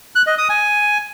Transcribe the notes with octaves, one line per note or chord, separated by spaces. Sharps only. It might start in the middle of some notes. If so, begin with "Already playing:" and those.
F#6
D#5
D#6
G#5